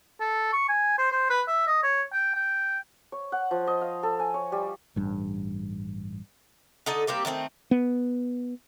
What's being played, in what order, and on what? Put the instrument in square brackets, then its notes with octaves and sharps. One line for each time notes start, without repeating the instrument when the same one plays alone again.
[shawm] A4
C#6
G#5
C5
C5
B4
E5
D#5
C#5
G5
G5
[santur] C#5
F#5
F3
D#5
F5
A4
G#5
C#5
G3
[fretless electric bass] A1 G2
[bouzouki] D3 D#4 A4 D#5
G3 A#3 C4 G4
D#3 A3 A#3 C4
[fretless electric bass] B3